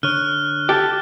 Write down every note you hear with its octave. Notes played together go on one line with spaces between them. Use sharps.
D3 C#5 F6 F#6 D#7
G4 A4